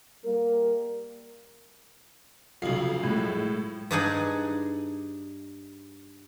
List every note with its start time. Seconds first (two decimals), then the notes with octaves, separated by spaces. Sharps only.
0.24 G3 A#3 A#4
2.62 B1 F2 C#3 C7
3.03 A2 G#3
3.91 G2 D4 D#4 G#4 F#5 G#5